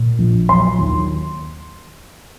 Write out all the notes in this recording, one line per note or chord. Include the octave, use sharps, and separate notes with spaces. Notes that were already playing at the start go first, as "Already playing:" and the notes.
Already playing: A#2
A#1
F#3 C6
D#2